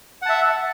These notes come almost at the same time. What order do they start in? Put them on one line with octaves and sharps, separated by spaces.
F#5 A5 E5